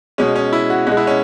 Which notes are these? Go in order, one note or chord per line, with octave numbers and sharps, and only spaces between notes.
B2 G#3 C#4
C#4
E4
F#4
B2 G#3 F#4
E4
C#4